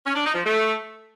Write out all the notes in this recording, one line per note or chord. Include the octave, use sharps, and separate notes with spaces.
C#4
D4
D#4
F3
A3